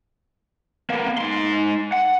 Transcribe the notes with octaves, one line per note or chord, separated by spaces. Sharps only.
A#3 B3
G#2 C6
F#5